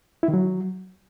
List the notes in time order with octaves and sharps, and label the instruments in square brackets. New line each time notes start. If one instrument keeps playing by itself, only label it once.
[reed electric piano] E4
D#3
F#3